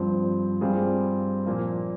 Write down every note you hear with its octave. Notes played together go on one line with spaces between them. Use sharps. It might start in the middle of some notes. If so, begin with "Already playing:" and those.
Already playing: G2 F3 C4
G2 G3 C4 F4 G#4
A#2 F3 A#3